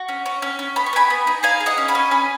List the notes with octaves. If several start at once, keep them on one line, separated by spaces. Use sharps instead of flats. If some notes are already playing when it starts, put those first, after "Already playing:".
Already playing: F#4
C#4
C#4
C#4
C#4
B3 B5
C#6
B3 G#5 B5
B3
D#4
G#4 F5 G#5
G#4
D#5 F#5
C#4
G#5 B5
C#4
C#4 G#5 B5